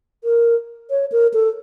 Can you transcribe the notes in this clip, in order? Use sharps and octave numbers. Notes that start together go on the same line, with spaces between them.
A#4
C#5
A#4
A4